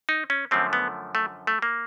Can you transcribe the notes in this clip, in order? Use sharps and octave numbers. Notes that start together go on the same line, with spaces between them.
D#4
C#4
F#2 D3 F3 A3 C4
B3
A3
A3
A#3